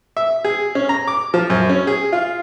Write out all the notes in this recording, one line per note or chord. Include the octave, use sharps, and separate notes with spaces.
E5
G#4
C#4
A#5
D6
F3
F#2
C#4
G#4
F4